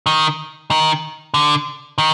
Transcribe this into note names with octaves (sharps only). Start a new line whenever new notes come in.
D#3
D#3
D3
D#3